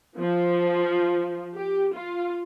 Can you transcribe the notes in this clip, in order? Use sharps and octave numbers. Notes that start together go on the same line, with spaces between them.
F3
G4
F4